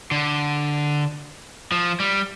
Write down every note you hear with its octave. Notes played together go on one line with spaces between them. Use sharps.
D3
F3
G3